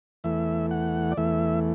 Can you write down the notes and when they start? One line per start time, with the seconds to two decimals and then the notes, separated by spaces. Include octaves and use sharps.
0.24 E2 E3 A3 E5
0.71 F#5
1.12 D5
1.17 E2 E3 A3 E5